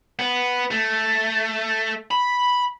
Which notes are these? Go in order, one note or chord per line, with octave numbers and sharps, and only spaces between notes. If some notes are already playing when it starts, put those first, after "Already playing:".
B3
A3
B5